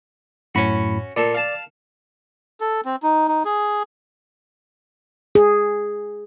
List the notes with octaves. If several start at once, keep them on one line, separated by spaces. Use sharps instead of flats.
F#2 A2 C#4 F#4 B5
A#2 A4 D5
F5 A5
A4
C4
D#4
D#4
G#4
G#4